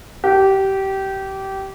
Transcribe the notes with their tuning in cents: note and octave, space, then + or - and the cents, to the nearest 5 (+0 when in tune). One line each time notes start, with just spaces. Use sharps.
G4 -20